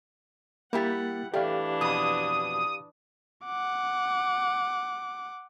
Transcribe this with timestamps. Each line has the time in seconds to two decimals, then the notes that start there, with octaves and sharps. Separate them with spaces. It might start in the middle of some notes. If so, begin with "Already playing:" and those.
0.73 G3 A#3 E4 G4 F#5 A6
1.34 E3 A3 D4 G4 D5 F5
1.81 F2 B2 D#6
3.45 F#5 D6